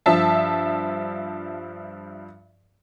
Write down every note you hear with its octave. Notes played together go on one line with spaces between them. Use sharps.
G2 F3 E5 A5